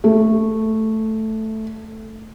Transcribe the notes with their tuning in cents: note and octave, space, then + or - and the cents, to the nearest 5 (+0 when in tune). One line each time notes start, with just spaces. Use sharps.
A3 +0